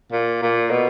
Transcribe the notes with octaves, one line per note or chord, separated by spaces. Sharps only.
A#2
A#2
B2